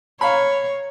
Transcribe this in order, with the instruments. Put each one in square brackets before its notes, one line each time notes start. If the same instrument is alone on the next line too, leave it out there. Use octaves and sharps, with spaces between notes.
[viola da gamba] C#5 [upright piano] F5 A#5 B5